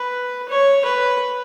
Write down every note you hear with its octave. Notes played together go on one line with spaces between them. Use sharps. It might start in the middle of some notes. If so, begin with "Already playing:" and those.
Already playing: B4
C#5
B4